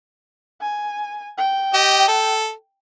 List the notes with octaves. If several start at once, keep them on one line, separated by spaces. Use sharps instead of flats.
G#5
G5
G4 D#5
A4